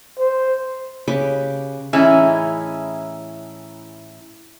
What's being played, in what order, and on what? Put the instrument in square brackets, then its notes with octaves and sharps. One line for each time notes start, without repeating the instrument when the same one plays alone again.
[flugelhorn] C5
[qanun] C#3 G4 B4 D6
[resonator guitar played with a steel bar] A2 E3 C#4 D#4 E4 G#4